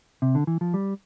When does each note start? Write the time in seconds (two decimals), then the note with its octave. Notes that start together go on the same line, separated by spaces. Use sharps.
0.22 C3
0.35 D3
0.47 E3
0.61 F3
0.74 G3